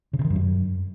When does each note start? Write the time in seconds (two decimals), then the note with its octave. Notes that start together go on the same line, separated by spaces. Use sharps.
0.13 C#3
0.19 C3
0.25 D#3
0.30 G2
0.36 F#2